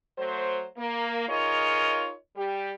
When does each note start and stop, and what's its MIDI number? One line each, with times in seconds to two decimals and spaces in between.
0.18 0.65 54
0.18 0.65 57
0.18 0.65 72
0.77 1.27 58
1.28 2.13 63
1.28 2.13 65
1.28 2.13 68
1.28 2.13 70
1.28 2.13 73
1.28 2.13 75
2.36 2.72 55
2.36 2.72 67